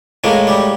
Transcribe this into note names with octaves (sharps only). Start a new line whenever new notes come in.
A2 G#3 A#3
G3